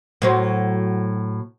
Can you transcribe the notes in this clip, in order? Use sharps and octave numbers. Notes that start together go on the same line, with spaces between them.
A2 F#3 C5